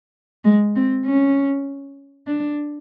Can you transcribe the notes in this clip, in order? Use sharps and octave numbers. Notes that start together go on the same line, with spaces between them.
G#3
C4
C#4
D4